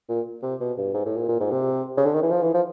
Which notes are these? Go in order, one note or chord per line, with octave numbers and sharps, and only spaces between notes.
A#2
C3
B2
G2
G#2
A2
A#2
A#2
G#2
C3
C#3
D3
D#3
E3
F3
E3
F3